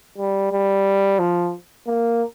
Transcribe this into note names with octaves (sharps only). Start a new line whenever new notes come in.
G3
G3
F3
A#3